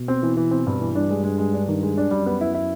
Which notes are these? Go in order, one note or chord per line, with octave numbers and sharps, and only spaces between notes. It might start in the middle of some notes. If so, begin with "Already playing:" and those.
Already playing: B2
C4
E3
E3
C4
G2
E3
G2 D4
G#3
G#3
G#3
D4
D#3
G#3
D4
F#2 G3
B3
E4
E4